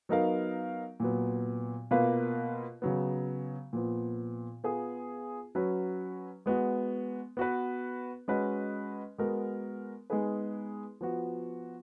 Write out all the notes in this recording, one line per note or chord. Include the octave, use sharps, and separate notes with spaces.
F#3 B3 D#4 A#4 F5
A#2 F#3 B3
B2 A#3 F4 B4 F5
C#3 F#3 B3
A#2 F3 B3
B3 F4 G#4
F#3 C#4 F#4 B4
G#3 B3 F#4
B3 F#4 B4
G#3 C#4 F#4 B4 D#5
G#3 B3 F#4 A#4
G#3 B3 D#4 G#4 B4
F3 B3 F#4